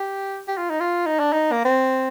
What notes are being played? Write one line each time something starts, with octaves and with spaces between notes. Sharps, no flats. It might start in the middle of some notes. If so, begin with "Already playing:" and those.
Already playing: G4
G4
F4
D#4
F4
D#4
D4
D#4
A#3
C4